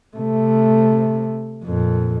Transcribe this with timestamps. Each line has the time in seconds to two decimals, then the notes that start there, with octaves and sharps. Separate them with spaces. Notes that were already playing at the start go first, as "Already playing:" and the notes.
0.17 C3 A3
1.64 F2 A#2